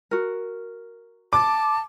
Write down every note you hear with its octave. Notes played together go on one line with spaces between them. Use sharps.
F#4 A#4
A5 D6